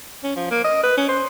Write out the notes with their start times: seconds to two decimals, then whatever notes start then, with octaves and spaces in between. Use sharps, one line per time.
0.24 C#4
0.36 F3
0.51 A#3
0.64 D#5
0.84 B4
0.98 C#4
1.09 C5